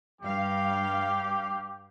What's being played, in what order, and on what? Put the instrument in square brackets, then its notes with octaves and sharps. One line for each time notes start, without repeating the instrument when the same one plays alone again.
[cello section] G2 F5 [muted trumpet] G4